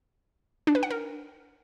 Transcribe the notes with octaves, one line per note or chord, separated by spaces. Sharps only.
D4
B4
F#5
A#4